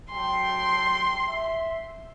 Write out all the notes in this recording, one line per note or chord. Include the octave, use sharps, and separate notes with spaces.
F#3 A4 G5 C6
E5